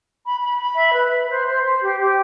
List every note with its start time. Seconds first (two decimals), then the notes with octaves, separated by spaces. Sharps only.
0.24 B5
0.41 B5
0.58 B5
0.75 E5
0.93 B4
1.10 B4
1.28 C5
1.46 C5
1.64 C5
1.81 G4
1.98 G4